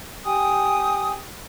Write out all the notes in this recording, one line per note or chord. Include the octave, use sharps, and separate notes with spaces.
G4 G5 G#5 D#6